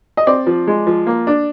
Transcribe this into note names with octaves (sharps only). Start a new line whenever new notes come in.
D#5
C4 D5
F3
G#3
F3
A#3
D4